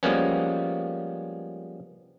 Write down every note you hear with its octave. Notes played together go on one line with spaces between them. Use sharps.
F3 G3 G#3 A#3 B3 C#4